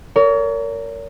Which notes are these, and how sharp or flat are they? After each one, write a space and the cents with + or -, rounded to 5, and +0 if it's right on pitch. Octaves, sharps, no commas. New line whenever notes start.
A#4 -15 C#5 +40